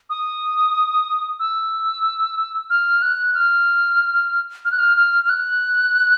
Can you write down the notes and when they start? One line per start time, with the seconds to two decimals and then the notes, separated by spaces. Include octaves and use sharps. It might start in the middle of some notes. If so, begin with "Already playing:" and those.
0.10 D#6
1.40 E6
2.70 F6
3.02 F#6
3.35 F6
4.65 F6
4.71 F#6
4.79 F6
4.97 F6
5.25 F6
5.29 F#6